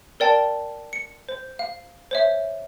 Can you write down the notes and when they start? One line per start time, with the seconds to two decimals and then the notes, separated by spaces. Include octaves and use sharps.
0.20 A#4 D5 G5 A5
0.93 C#7
1.29 C5
1.59 F5
2.11 C5 C#5 E5